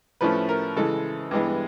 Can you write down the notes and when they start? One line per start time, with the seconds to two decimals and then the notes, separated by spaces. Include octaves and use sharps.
0.21 A2 F3 A3 C#4 B4
0.49 A#4
0.76 C#3 E3 G#3 A4
1.31 G2 E3 G#3 B3